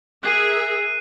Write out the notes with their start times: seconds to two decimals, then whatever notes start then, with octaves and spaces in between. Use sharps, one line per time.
0.23 G#4 A#4 E5 F#6 C7 D#7